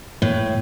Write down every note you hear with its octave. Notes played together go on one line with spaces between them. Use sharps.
A2